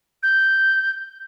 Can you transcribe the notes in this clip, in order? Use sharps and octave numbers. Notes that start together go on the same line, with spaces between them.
G6